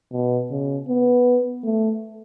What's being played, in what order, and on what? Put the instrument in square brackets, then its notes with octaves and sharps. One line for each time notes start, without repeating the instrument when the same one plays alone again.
[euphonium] B2
C#3
B3
A3